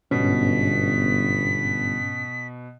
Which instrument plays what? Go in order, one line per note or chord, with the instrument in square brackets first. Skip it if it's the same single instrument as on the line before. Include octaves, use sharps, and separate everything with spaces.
[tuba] G1 [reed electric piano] G#2 C#4 [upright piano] B2 [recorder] B6